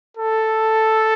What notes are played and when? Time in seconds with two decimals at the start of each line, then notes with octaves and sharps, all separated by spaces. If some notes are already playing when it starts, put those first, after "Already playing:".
0.17 A4